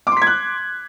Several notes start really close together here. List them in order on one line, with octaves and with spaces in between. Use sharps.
D6 C6 B6 G#6 F#6